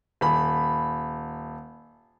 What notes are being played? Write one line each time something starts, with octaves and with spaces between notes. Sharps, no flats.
D#1 B5